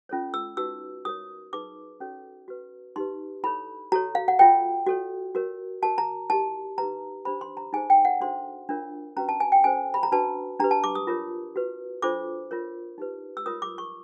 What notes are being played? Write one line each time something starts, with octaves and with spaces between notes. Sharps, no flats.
C#4 F4 A4 C#5
E6
D#4 F#4 B4 E6
F#4 A#4 C#5 D#6
D#4 G#4 B4 D6
C#4 F#4 A4 C#5
F#4 B4
D#4 G4 B4 C6
E4 A4 C#5 B5
F#4 A4 C#5 A#5
F5
F#5
F4 A4 C#5 G5
F#4 A4 C#5
F#4 A#4 C#5
F#4 A#4 C#5 A5
A#5
E4 G4 A#4 A5
D#4 G4 B4 A#5
D4 G4 C5 B5
C6
A#5
D#4 G#4 C5 G#5
G5
F#5
D4 F#4 A4 C5 C6
D4 F4 A#4 C#5
C#4 F#4 B4 A#5
A5
G#5
G5
C#4 F#4 A4 C5 G#5
B5
A#5
D4 F#4 B4 A5
D4 G4 B4 A#5
A5
D6
D#6
F4 A#4 C#5
F#4 B4
D4 F4 A4 C5 D6
F4 A#4 C#5
D#4 G4 B4
E6
F4 A#4 C#5 D#6
D6
C#6